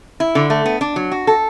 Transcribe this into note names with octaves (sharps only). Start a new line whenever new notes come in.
E4
D3
A3
B3
D4
F#3
F#4
A4